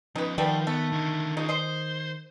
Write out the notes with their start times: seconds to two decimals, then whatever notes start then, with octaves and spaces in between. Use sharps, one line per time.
0.16 F3 C#4 D#4 B4
0.38 D#3 F3 G3 A3 B3
0.67 A3 B3
0.92 D3 D#4
1.37 D#4 F4 G#4
1.49 C5 D#5 C6